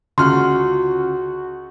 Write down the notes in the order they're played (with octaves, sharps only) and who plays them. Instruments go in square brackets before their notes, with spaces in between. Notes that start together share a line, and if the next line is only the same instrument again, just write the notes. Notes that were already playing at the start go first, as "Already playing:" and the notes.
[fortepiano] C#2 F6 [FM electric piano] D3 C#4 F4 [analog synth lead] F#4 [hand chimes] C6